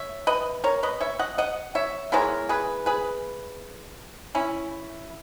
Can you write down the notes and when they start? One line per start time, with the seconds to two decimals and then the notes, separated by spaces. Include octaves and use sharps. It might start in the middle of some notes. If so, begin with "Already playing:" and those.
Already playing: C#5 E5
0.27 B4 D#5
0.64 A#4 C#5
0.83 B4 D#5
1.01 C#5 E5
1.19 D#5 F#5
1.38 D#5 F#5
1.75 C#5 E5
2.12 E3 G#3 B3 A#4 C#5
2.49 G#4 B4
2.86 G#4 B4
4.35 C#4 E4